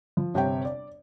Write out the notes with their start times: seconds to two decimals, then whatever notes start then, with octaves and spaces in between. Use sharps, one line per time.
0.17 F3
0.34 G1 C3 C4 G4 C#5 G5
0.65 D5